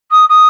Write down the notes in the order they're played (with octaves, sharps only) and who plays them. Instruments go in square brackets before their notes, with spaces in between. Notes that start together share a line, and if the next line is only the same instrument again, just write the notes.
[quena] D#6
D#6